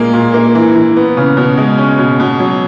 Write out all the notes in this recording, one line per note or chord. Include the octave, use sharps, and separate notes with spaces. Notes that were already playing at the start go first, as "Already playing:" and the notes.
Already playing: A#2 G#3 A#3
A#2
A#3
E3
E3
B3
C#3
B2
G#3
C#4
B2
B2
F#3